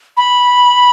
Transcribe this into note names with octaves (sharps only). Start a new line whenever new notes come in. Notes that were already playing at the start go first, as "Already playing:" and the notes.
B5